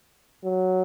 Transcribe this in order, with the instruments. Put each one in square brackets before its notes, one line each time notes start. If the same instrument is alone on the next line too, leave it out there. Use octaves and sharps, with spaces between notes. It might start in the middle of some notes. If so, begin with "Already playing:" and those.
[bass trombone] F#3